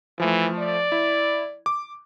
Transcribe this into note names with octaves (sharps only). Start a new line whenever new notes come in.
E3 F3 A3
D5
E4
D6